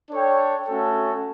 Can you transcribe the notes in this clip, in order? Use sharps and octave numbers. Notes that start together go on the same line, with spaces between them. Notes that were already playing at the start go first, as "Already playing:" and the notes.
D4 A4 C#5 G5
A3 C#4 F#4 A4